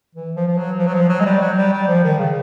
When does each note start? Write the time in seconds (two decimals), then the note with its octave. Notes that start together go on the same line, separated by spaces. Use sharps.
0.15 E3
0.36 F3
0.48 F3
0.57 F#3
0.78 F3
0.87 F#3
0.94 F3
1.09 F#3
1.20 G#3
1.25 G3
1.41 F#3
1.57 G3
1.73 G3
1.88 F3
2.04 D#3
2.19 C#3